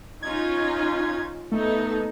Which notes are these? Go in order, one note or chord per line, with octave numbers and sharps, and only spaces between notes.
C#4 D#4 F4 G#6
A3 B3 D#4 A4